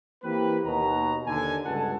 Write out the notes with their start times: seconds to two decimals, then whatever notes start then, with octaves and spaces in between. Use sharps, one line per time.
0.23 E3 A#3 C4 G4 B4
0.65 D#2 B2 A#5
1.27 D#2 D3 G#5
1.65 C#2 G2 B2 A4 F#5 A5